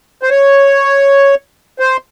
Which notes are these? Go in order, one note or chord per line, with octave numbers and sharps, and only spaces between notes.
C5
C#5
C5